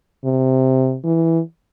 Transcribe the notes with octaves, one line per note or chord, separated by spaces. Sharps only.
C3
E3